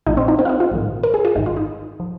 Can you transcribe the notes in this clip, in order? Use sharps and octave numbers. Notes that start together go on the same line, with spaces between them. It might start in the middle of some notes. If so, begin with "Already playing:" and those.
A#1 A#2 F3 D#4
C4
D#4
C4
F4
D#4
F4
A#1 G#2 D#3
A#4
G#4
F4
G#1 G#2 D#3 D#4
F4
D#4
F3